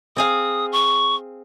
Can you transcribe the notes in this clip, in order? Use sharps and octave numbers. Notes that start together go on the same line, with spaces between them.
C4 G#4 F5 D#6
C#6